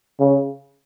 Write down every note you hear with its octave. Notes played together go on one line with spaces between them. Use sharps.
C#3